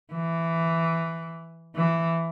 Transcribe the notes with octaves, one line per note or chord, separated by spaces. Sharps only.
E3
E3